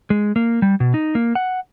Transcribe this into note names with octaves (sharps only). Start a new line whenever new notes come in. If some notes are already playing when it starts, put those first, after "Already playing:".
G#3
A#3
G3
B2
D#4
A#3
F#5